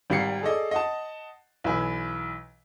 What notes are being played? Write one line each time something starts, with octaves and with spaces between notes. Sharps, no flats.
G#1 D#3 G3 F5 C7 C#7
G#4 A4 D5 D#5
D#5 F#5 A5
B1 E3 B4 G#5